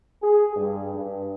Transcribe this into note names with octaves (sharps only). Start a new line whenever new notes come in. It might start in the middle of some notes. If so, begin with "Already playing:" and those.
G#4
G2
G2